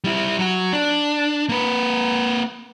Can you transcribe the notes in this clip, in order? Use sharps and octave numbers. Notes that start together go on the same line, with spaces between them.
G3 E4
F#3 F#4
D4
A#3 B4